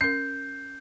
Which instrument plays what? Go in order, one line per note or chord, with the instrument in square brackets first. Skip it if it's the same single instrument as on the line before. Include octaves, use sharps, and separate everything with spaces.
[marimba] C#4 A#4 [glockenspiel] G6 [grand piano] C7